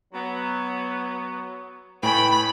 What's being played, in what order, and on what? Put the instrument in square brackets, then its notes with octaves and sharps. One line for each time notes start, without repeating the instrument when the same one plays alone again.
[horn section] F#3 B3
[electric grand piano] A2 G#5 [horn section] A3 B4 G5 [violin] B5